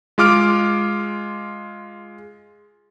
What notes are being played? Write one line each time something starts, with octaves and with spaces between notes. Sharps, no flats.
G#3 F4 D6 F6 D7